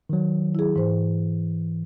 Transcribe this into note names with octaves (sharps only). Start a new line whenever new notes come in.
D#3 F#3
E4 G#4
G#2 E3 C5